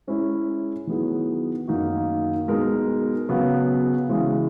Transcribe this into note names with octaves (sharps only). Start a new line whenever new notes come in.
G#3 C#4 E4 G#4
D#3 F#3 B3 E4 G#4
F#2 D#3 A#3 D#4 F#4
B2 G#3 D#4 A#4
C#3 F#3 B3
C#3 E3 G#3 C#4